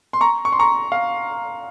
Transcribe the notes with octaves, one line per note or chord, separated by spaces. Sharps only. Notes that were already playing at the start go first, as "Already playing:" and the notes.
C6
A#5 C#6
C#6
C6
A#5 C#6
F5